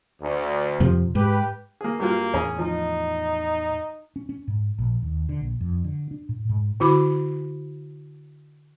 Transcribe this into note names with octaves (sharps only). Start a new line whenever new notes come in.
D2
F2 C3 F3
G#2 G4 B4
A#3 G#4
G2 F#3 A#3 F4
E2 A2 C#4 G#4 A#5
F3 D#4
C#4
C#4
G#2
A#1
D#2
D3
A#1
F2
D3
D4
A2
G#2
D3 E4 F#4 B5 D6